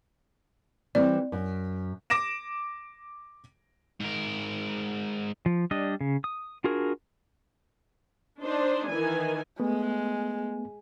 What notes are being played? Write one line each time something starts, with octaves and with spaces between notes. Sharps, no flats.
E3 G3 C4 D5
F#2
D6 A#6 D7 E7
G#2 A#4
F3
G3 D4 D#5
C#3
D#6
D4 F4 F#4 G#4 A#4
D4 D#4 C5
D#3 E3 G#5
G#3 A3 B3